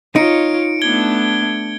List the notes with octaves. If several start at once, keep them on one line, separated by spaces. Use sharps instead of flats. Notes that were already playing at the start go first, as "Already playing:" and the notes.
D#4 F4 C#5 C#7 D7
A3 B3 D4 G#6 G7